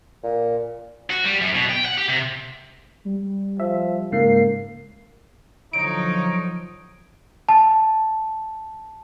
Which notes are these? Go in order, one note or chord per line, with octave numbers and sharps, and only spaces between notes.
A#2
F#4
G3
F#2
B2
G5
F#5
G4
C3
G3
F3 E5
G#2 C#3 A#3 C7
D3 F3 F#3 D#4 C#5 D7
A5